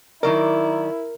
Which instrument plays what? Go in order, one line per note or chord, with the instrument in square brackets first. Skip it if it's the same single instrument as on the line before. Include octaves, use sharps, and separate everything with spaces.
[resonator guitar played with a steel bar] D#3 F#3 D5 [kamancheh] E4 [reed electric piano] A#4